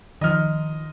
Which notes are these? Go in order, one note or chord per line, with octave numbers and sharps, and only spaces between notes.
D#3 F3 D#5 F6